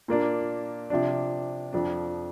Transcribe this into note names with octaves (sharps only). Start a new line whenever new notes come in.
A#2 A#3 D4
C3 F3 D4
F2 F3 D4